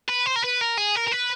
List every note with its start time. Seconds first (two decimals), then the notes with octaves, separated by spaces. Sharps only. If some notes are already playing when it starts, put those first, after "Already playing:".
0.09 B4
0.26 C5
0.36 A#4
0.44 B4
0.61 A#4
0.77 G#4
0.95 A#4
1.07 A#4
1.11 B4